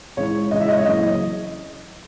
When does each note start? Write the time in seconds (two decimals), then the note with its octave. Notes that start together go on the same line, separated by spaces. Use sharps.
0.17 C#2 C#3 E3 C#5
0.51 C#2 C#3 E3 D#5
0.61 E5
0.68 D#5
0.77 C#5
0.86 F#1 F#2 E3 D#5